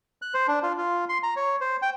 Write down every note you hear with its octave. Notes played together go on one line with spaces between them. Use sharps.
F#6
C5
D4
F4
F4
C6
A#5
C#5
C5
G5